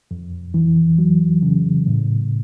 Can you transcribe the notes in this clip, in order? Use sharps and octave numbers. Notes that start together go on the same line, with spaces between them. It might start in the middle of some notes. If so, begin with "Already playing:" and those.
F2
E3
F#3
C#3
A2